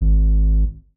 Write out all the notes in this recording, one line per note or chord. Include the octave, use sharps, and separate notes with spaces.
G#1